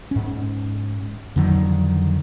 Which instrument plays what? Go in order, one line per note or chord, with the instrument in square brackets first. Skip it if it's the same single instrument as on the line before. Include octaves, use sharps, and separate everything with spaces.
[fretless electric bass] G#2 C#4
F2 D3 D#3 F#3